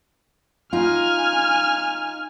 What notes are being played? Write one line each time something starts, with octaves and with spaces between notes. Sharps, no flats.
D#4 F4 G#5 F6